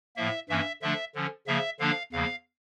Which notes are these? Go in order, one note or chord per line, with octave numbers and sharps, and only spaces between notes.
A2 F3 A#3 E5
G2 E3 A#3 C#4 E5
D3 F3 A3 D4 E5
D3 F3 C#4
C#3 F3 A#3 E5
D3 F3 A#3 D4 F5
E2 C#3 F3 A#3 F5